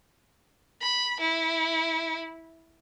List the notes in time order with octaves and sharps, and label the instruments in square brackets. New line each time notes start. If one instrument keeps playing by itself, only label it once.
[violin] B5
E4